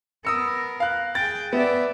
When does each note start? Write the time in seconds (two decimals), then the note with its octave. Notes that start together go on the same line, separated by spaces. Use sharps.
0.25 B3 A#4 D#6 E6 C#7
0.80 F5 F#6
1.15 G#4 G5 A6
1.53 B3 D5 E5